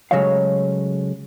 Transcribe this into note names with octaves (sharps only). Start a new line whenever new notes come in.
C#3 F#3 G#3 A3 C#5 F5